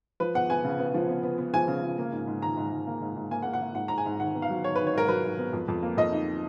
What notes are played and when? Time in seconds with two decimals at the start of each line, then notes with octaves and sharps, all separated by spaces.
0.20 F3 B4
0.34 B3 F#5
0.50 B3 G#5
0.64 C#3
0.79 B3
0.94 F3
1.09 B3
1.23 B3
1.38 B3
1.54 F3 G#5
1.68 C#3
1.83 C#3
1.98 A#3
2.12 G#2
2.27 G#2
2.42 D#3 A#5
2.57 G#2
2.72 G#2
2.87 A#3
3.01 G#2
3.16 G#2
3.31 A#3 G#5
3.42 F#5
3.45 A#3
3.53 F#5
3.61 A#3
3.75 G#2 F#5
3.88 G#2 A#5
3.98 G#5
4.06 G#2
4.20 D#3 F#5
4.35 B3
4.42 F5
4.50 F#3
4.64 G#2 C#5
4.76 D#3 B4
4.87 C#5
4.93 G#2 A#4
5.08 F#3 B4
5.24 G#2
5.38 B3
5.53 F2
5.68 F2
5.83 A#3
5.97 F2 D#5
6.12 D#4